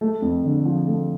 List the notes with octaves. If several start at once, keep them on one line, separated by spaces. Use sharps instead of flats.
A3
F2
D3
F3
A3